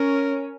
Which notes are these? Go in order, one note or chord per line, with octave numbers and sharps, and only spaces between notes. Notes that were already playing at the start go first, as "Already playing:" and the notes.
Already playing: C#4 A#4